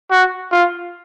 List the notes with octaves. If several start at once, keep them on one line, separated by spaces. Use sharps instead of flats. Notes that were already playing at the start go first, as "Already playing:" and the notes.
F#4
F4